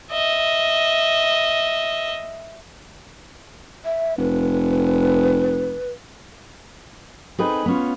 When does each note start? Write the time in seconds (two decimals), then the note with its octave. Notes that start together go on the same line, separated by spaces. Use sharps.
0.12 D#5 E5
3.85 E5
4.18 F1 B4
7.38 C4 D#4 G#4 A4 B4
7.66 B3 C#4 F4